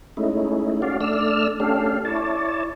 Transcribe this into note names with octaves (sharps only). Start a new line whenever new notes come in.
G#3 A3 C#4 D#4 E4
C#4 F#4 D5 F5
A3 D4 D5 E6 F6
A3 C#4 D4 G4 A4 F5
E4 C#5 D5 A5